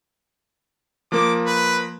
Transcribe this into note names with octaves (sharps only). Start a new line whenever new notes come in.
F3 A#3 D6
B4